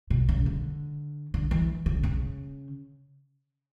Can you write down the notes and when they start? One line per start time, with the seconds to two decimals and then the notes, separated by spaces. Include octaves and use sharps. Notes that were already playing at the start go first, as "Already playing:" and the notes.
0.10 B2
0.29 C#3
0.46 D3
1.34 D3
1.51 E3
1.86 C#3
2.03 C#3